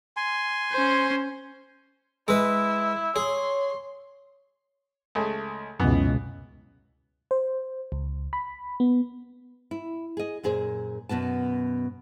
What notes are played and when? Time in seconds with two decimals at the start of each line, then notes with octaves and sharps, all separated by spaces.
0.17 G#5 C6
0.73 C#4 C5
2.28 G#3 E4 B4 E6
3.16 G#4 C#5 C6
5.15 C#2 A3 G#4
5.80 C#2 F#2 B2 E3 B3
7.31 C5
7.92 C#2
8.33 B5
8.80 B3
9.71 E4
10.17 G#4 D#5
10.43 F#2 A#2 G#4 C5
11.09 F#2 B2 B3 A5